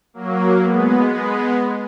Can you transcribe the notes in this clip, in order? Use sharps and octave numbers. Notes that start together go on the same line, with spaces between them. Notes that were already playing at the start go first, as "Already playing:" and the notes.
F#3 A#3
G#3 B3
G#3 B3